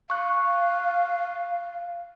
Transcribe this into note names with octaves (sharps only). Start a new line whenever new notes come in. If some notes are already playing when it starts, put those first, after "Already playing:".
F5 C#6 F#6